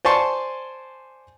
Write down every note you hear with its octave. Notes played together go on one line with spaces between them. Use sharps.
C5 D5 G#5 A5 C6 C#6